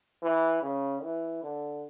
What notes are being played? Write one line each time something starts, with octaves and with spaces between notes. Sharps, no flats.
E3
C#3
E3
D3